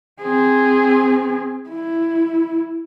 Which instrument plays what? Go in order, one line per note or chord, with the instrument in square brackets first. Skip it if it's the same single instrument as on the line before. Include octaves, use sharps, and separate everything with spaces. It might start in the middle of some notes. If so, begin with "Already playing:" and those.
[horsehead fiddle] C4 G#4
E4